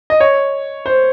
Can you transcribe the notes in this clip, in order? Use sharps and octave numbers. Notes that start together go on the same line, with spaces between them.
D#5
C#5
C5